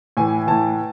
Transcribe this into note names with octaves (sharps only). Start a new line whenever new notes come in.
A2 E3 G#5
A2 E3 A5